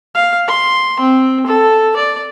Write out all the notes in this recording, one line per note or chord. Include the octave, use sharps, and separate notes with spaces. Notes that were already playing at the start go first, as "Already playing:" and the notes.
F5
C6
C4
A4
D5